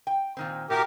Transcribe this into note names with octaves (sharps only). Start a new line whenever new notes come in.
G5
A#2 D#3 C4
A2 F#4 G4 A#4